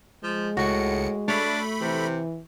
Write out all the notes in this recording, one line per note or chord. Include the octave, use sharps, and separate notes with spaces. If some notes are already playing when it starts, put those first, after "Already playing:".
F3 G#3
C#2 A2 F#4 C#7
A3 D4 C#5 B5
C3 E3